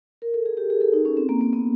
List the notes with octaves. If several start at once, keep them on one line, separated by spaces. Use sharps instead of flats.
A#4
A4
G#4
G4
G#4
A4
D#4
C#4
C4
A#3
A#3
B3